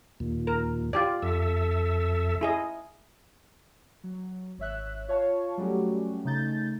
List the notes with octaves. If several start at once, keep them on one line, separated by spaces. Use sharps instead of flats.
D#2 A#2
A#4
F4 G4 D5
F2 A4 E5
E4 G#4 D#5
F#3
G#1 C#5 E5 F#6
F4 C#5 F5 A5 C#6
F#3 G3 A3 C#4 F#4 G4
C#3 A3 D#4 G6 A6